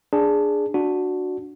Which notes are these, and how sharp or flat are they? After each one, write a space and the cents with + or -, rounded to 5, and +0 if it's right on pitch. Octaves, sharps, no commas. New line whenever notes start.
D4 +0 G#4 +0
D4 +0 F#4 -10